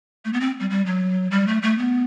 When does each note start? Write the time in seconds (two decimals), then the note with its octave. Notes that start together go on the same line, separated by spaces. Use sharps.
0.25 A3
0.33 B3
0.40 C4
0.60 G3
0.70 G3
0.86 F#3
1.31 G3
1.48 A3
1.62 A3
1.78 B3